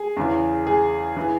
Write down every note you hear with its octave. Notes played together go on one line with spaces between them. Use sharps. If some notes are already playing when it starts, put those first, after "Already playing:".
Already playing: G#4
E2 C#3 E3
G#4
E3